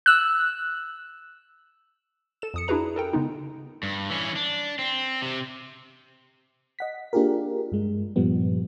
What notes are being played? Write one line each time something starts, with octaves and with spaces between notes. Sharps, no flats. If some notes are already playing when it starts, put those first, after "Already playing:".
E6 F#6
A4 E7
F2 D#6 C#7
D4 E4 F#4 G#4 B4 A#5
A4 A#4 G5
C#3 G#3 B3 D#4
G2
E3 C#4
D4
C4
C3
D#5 F#5 B6
A#3 D4 F4 G4 G#4 A#4
G2 G#3
G2 A#2 F3 G3 B3